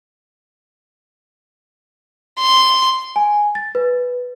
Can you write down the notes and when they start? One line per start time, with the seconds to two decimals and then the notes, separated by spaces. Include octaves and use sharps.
2.40 C6
3.16 G#5
3.55 A6
3.75 B4